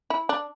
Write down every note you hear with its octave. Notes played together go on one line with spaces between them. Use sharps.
E4
D4